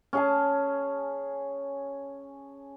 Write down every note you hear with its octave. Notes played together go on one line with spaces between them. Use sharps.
C#4 G#4 A5